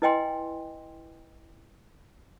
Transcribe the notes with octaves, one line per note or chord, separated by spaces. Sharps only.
E4 B4 D#5 G5 G#5 C6